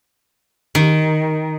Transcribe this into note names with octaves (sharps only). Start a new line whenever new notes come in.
D#3